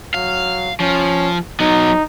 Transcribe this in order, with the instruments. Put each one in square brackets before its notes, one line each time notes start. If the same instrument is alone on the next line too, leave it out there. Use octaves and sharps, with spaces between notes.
[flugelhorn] F#3 [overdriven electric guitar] F5
[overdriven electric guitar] F3 [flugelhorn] C#4
[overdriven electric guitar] F#3 B3 [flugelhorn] D#4